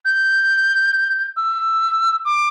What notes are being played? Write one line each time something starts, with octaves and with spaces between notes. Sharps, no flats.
G6
E6
D6